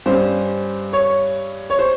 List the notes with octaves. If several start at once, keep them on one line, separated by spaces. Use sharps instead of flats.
G2 G3 C#4 C5
C#5
C#5
C5